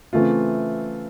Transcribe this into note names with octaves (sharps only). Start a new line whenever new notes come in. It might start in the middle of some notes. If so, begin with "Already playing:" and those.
C#3 E3 A3 C4 F4